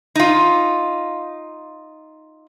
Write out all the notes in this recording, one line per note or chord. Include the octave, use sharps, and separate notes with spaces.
D#4 F4